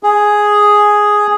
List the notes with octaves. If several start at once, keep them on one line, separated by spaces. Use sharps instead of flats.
G#4